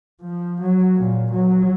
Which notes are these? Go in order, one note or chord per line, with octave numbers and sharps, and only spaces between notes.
F3
F#3
A#2
F#3